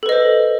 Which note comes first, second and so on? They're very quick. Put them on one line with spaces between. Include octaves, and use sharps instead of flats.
A4 B4 D#5 C5